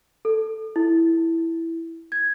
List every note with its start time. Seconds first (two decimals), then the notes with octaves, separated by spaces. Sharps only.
0.25 A4
0.76 E4
2.12 G#6